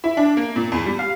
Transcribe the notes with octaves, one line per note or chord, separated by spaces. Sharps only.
E4
D4
A#3
A#2
E2
G3
F5